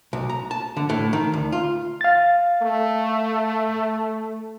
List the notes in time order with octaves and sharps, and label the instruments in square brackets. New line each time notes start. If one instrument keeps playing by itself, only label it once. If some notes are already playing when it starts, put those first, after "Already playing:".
[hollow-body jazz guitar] B1
A#5
A5
D3
A2
D#3
D2
F4
[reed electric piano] F5 A6
[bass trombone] A3